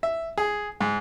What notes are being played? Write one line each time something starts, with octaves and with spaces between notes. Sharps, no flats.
E5
G#4
G#2